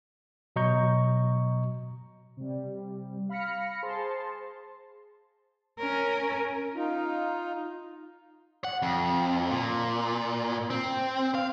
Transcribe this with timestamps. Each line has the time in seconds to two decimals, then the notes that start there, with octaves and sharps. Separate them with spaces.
0.56 B2 F#3 D#5 A#5 C#6 G6
2.37 C3 G3
3.29 F5 B5 F6 A#6 C#7
3.82 G#4 C5 A5 C6
5.79 C#4 A#4
6.75 D#4 F4
8.64 F#5
8.82 F2
9.51 A#2
10.70 C4
11.35 F5